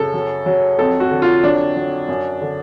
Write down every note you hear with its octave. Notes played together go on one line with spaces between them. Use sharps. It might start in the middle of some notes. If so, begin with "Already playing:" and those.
Already playing: F#2 C#3 A4
F#3
F#3
F2 A4
F#4
D3
F4
F#3 D4
F#3
F#2
D3